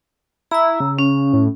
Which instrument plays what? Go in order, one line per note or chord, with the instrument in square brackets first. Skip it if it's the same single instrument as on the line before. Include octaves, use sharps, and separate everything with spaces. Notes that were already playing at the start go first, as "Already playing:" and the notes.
[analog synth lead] E4 [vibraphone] A#5 E6
[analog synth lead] C#3
[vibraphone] C#4
[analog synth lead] A2